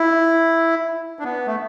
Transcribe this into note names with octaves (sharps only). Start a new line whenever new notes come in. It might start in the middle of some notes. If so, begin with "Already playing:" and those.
Already playing: E4
D4
B3
A3